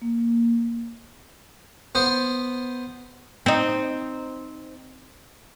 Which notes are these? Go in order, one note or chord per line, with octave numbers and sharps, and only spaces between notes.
A#3
B3 C5
C4 D#4